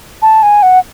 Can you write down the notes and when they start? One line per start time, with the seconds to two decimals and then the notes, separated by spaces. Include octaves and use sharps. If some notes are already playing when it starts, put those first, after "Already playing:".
0.22 A5
0.43 G#5
0.63 F#5